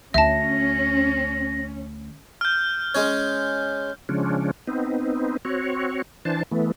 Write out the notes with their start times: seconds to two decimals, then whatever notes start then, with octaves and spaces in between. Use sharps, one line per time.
0.14 D2 C#4 E5 A5 A#6
2.41 F6 G6
2.95 G#3 C#4 C#5
4.09 C#3 F3 G#3 C#4 D4
4.67 B3 C4 D#4
5.45 C4 F#4 C#5
6.25 E3 D4 C5 A5
6.51 E3 A3 B3